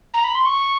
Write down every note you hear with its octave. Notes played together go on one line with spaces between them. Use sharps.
A#5
B5
C6
C#6